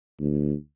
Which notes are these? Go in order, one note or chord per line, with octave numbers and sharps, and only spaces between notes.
D2